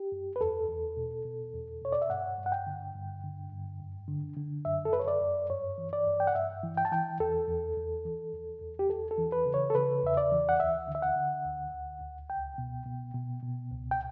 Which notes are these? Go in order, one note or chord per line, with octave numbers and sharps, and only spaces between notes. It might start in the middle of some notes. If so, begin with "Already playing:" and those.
Already playing: G4
F#2
B4
E2 A4
E2
B2
B2
E2
B2 C#5
D5
E5
G2 F#5
G2
F#5
G5
D3
G2
D3
G2
F#2
D3
D3
F#2 E5
A4
F#2 B4
C#5
D5
F#2
G2 C#5
E3
D5
G2
G5
F#5
G2 E5
E3
G5
A5
E3 G5
E2 A4
E2
E2
E3
E2
E2
G4
E2 A4
A4
E3
B4
C#3
C#5
A4
C#3 B4
E2 E5
D5
E3
F#5
D2 E5
D3
E5
F#5
D3
D2
D2
D2
C#2 G5
B2
B2
B2
B2
C#2
G5